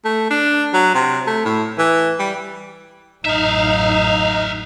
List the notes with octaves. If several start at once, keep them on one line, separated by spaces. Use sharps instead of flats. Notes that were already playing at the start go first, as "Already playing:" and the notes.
A3
D4
F#3
C3
A3
A2
E3
G3
A1 F#2 D#4 E5 F5